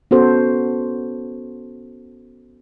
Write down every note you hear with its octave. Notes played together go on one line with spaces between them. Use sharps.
B3 C#4 F#4 A4 C5